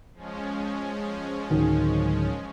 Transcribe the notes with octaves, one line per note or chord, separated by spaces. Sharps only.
F3 G#3 C#4
D1 D#3 F#3